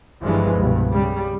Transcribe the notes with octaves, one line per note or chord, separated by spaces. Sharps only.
G1 G2 E3 F3 G#3
C2 G2 B2
C#3 G3